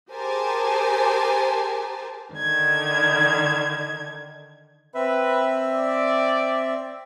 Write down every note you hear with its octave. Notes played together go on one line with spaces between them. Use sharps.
G4 G#4 A#4 C5 G#5 A5
D3 D#3 G#6
C4 B4 E5
D5